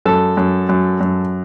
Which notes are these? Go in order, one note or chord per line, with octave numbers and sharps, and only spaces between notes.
F#2 A4
F#2
F#2
F#2